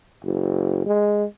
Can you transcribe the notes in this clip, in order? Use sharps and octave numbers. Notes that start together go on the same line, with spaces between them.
F#1
G#3